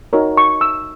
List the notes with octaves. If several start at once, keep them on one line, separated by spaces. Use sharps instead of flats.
D#4 F#4 A#4 C#5
C#6
E6